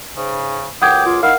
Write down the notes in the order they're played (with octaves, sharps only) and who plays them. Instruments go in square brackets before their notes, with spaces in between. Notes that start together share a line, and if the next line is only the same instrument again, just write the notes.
[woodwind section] G#2 C#3
[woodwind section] C#2 F#2 D6 [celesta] F#5 D#6 G#6 [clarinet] G5
[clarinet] F4
[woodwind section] D#4 E4 [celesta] A#4 F#5 [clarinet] F5